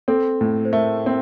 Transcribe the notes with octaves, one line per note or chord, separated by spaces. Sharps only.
C4 A4
A2
C5
A3 A#4
C4